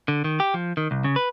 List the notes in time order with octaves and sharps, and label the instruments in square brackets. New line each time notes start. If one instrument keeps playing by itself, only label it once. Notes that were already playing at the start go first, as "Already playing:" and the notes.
[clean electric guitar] D3
D#3
G4
F3
D#3
C2
C#3
B4